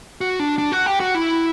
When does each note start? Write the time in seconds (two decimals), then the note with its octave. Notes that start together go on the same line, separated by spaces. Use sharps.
0.21 F#4
0.40 D4
0.58 D4
0.72 F#4
0.86 G4
1.00 F#4
1.15 E4